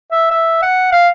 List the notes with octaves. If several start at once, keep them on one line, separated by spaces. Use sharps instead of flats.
E5
E5
F#5
F5